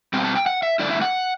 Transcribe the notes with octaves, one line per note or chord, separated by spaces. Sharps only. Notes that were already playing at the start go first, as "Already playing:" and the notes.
B2 G3 C4 G5
A5
G5
F#5
E5
G2 D3 A3 E4 D5
E5
F#5